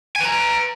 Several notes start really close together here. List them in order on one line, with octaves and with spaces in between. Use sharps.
G#5 B4 A#5